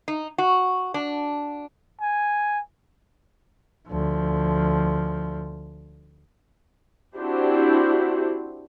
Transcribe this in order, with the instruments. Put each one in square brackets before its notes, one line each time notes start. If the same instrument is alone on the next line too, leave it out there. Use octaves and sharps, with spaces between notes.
[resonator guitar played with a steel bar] D#4
F#4
D4
[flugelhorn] G#5
[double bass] D2 F3
[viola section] C4 D4 E4 F#4 G4 C5